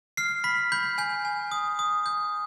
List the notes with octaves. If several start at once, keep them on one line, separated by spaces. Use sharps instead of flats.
F6 C7
B5 B6
B5 G6
G#5 G6
G#5
D#6
D#6
G6